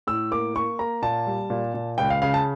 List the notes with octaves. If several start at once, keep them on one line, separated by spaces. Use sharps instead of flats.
A2 E6
A#3 D6
A#3 C#6
A#3 A#5
A#2 A5
G3
A#2
A#2
C#2 G5
F5
C#3 F5
A5